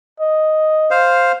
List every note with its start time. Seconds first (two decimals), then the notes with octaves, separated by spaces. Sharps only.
0.20 D#5
0.91 C5 F5